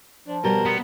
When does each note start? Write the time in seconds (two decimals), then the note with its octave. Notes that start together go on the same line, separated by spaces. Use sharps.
0.28 F3 D4
0.44 B2 G3 A#4 C5
0.66 B3